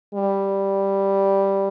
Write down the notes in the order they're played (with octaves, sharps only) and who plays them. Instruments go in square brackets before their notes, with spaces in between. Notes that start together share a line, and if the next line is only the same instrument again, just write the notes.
[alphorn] G3